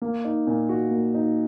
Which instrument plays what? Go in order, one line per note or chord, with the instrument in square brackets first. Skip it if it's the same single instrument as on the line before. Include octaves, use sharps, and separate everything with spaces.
[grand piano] A#3
D#4
A#2
F#4
A#3
D#4